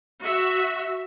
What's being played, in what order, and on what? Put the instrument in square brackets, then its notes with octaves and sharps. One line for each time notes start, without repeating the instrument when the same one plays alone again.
[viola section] F#4 E5